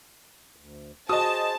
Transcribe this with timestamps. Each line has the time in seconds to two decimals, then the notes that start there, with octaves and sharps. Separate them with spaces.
0.56 D2
1.09 F#4 G#4 C5 D#5 A5 D#6